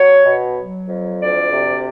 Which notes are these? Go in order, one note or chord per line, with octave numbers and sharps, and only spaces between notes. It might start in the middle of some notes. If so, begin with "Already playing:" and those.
Already playing: F#3 C#5
B2
F#3
F2
D2 D5
C3